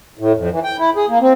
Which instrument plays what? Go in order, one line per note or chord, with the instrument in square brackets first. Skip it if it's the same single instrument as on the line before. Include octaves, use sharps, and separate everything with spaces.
[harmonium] A2
F2
E3
G5
E4
G#4
A#3
C4